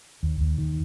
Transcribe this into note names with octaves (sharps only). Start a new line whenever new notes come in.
D#2
D#2
D#3